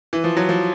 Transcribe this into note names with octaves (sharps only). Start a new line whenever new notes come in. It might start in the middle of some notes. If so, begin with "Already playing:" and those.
E3
F3
F#3
F3